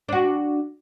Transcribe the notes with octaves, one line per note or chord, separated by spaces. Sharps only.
D4 F#4